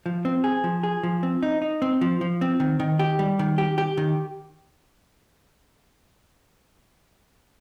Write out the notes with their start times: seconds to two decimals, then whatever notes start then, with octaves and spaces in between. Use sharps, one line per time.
0.06 F3
0.25 C4
0.44 G#4
0.64 F3
0.83 G#4
1.03 F3
1.23 C4
1.43 D#4
1.62 D#4
1.82 C4
2.01 F3
2.21 F3
2.41 C4
2.60 D#3
2.80 D#3
2.99 G4
3.19 G3
3.39 D#3
3.58 G4
3.78 G4
3.97 D#3